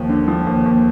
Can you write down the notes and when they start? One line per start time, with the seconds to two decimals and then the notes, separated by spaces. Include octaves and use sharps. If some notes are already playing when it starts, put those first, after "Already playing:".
Already playing: D#2 F3
0.09 D3
0.28 F3
0.47 D#2
0.65 D#2